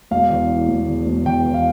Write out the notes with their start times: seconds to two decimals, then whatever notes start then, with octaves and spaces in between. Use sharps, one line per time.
0.11 E1 F5
0.30 E2
0.50 E3
0.69 E1
0.87 E2
1.06 E1
1.25 E2 G5
1.45 E2
1.54 F5